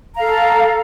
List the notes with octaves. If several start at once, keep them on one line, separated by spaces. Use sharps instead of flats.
A4 F5 A#5